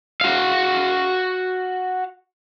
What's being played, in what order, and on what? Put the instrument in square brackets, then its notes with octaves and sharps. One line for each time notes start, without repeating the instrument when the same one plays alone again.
[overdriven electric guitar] F#4 F5